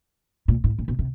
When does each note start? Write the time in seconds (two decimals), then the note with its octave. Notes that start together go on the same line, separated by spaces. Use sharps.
0.48 A#2
0.64 A2
0.79 A#2
0.88 B2
0.99 C3